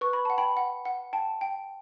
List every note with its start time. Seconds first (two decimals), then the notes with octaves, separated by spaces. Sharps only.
0.01 B4 C#6
0.13 B5
0.25 F#5 A5
0.38 G5 B5
0.57 F#5
0.85 F#5
1.13 G5 A5
1.41 G5